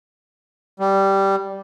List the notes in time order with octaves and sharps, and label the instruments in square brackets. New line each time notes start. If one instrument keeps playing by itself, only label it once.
[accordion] G3